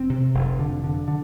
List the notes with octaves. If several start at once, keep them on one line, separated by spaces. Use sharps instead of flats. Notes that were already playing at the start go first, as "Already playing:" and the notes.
Already playing: F1 C4
C3
F1
D3
D3
D3